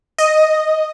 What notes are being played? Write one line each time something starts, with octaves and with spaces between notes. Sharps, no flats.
D#5